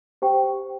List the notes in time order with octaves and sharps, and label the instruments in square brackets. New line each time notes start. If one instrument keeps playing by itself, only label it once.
[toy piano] G4 C5 G5